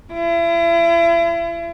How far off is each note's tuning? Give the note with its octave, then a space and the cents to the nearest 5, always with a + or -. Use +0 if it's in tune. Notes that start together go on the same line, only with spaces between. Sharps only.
E4 +40